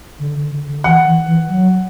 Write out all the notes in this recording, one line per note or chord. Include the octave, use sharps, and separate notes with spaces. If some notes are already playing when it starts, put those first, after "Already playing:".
D3
D3
D3
D3
E3 F#5
E3
E3
F#3